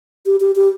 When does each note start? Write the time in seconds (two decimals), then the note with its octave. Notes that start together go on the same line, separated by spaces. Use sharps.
0.26 G4
0.40 G4
0.56 G4